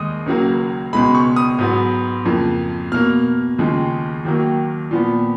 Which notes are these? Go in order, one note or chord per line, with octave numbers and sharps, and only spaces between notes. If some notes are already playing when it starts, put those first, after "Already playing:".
Already playing: D#2 G#3 D#6
C#2 C#3 F#3 A#3
C#2 B2 G#3 B5
C#6
D#6
G#2 F#3 B3
F2 C#3 F3 A#3
B2 A#3 F6
D#2 C#3 F3 G#3
D#2 D#3 F#3 A#3
A#2 F3 B3